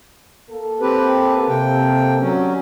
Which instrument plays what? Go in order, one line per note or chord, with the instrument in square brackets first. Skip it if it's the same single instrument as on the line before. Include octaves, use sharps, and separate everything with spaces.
[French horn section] A#3 A4
[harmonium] C4 G4 B4
[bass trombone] C3 [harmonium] G5
[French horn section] D2 [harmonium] F#3 C#4